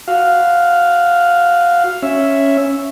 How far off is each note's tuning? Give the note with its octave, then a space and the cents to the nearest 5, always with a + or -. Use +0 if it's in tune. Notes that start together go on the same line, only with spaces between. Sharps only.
F#4 -5 F5 +0
C#4 +0 E5 +0